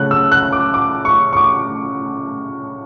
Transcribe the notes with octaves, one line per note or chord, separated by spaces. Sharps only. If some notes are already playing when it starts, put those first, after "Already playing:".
Already playing: C#3 A3 C#4 F#6
E6
F#6
D6
D6
C#6
C#6
D6